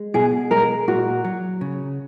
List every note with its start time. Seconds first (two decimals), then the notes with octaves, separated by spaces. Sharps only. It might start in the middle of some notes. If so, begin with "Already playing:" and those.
Already playing: G#3
0.14 B2 G#4
0.51 G#3 A#4
0.88 A#2 F#4
1.24 F#3
1.61 C#3